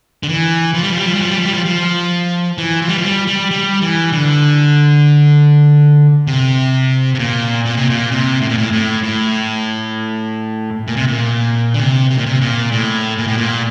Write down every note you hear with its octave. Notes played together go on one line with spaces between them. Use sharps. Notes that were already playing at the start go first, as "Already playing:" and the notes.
D3
E3
F3
G3
F3
G3
F3
G3
F3
G3
F3
G3
F3
F3
E3
F3
G3
F3
G3
G3
G3
E3
D3
C3
C3
A#2
A#2
C3
A#2
C3
A2
A#2
A2
A2
A2
A#2
C3
A#2
D3
C3
C3
A#2
C3
A#2
A2
A#2
A2
A#2